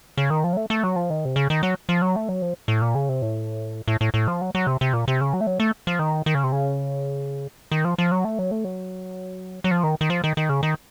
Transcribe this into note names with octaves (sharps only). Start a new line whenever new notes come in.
C#3
D#3
F3
F#3
A3
A3
F#3
F3
D#3
C3
C#3
D#3
F#3
F3
F#3
A3
F#3
F3
A2
A#2
C#3
C3
A2
A2
A2
A2
F3
F#3
F#3
C3
C3
A#2
C3
C#3
F#3
A3
F#3
A3
F3
D#3
D#3
C#3
C3
C#3
D#3
F3
F3
F#3
A3
F#3
A3
F#3
F#3
F3
D#3
D#3
F3
D#3
D#3
C#3
D#3